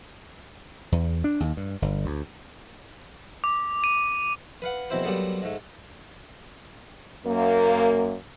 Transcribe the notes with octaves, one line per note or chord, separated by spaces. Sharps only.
E2
D4
D#2
G2
G1
D2
D6
D#7
B4 F5 F#5
A#1 B2 C4 E4 C5
F#3 G3 A#3 B3 A4 C5
G#2 A3
F#2 A#3